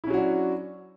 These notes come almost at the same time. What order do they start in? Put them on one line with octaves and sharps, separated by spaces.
E4 C#4 F#3 F#4 D4